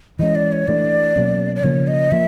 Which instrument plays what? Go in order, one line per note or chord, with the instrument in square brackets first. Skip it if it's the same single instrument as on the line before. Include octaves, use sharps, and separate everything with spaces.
[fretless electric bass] E3 G#3 C#4 [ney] D#5
[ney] D5
C#5
[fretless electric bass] E3 A3 D4 [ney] D5
[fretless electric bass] B2 F#3 A#3 C#4
[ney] D5
[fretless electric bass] C#3 F3 A#3 [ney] C#5
[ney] D#5
[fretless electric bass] F3 A#3 [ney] E5